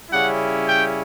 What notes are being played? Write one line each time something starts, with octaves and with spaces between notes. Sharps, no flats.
C#3 G3 C#4 E4 F#5
G5